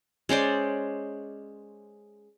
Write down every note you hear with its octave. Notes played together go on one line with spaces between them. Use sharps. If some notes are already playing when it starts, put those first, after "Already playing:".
G#3 C#4 C5 D5